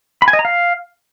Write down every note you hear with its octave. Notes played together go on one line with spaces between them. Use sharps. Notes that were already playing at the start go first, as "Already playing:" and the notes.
B5
G#5
D#5
A#5
F5